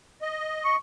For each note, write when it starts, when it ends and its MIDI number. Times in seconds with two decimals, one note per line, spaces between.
0.22 0.76 75
0.65 0.76 85